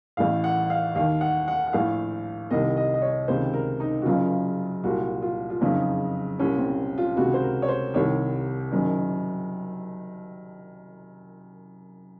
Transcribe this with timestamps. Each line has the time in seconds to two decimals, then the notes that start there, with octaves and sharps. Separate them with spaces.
0.17 A1 A2 F5
0.44 F#5
0.70 F5
0.95 D#2 D#3 F5
1.21 F#5
1.48 F#5
1.67 F#5
1.73 A#1 A2 F5
2.51 C2 C3 D#3 D#5
2.77 D#5
2.94 D#5
3.02 C#5
3.28 C#2 C3 D#3 C5
3.54 A#4
3.80 D#4
4.02 F#4
4.05 F#1 F#2 C#3 F4
4.84 C2 A#2 F#4
5.22 F4
5.50 F4
5.61 F#1 F2 C#3 D#4
6.38 C2 A#2 C#4
6.59 C4
6.98 F4
7.16 C#2 C3 D#3 F#4
7.34 C5
7.42 A#4
7.62 C#5
7.68 C5
7.94 C2 C3 D#3 C#5
8.72 F#1 F#2 D#3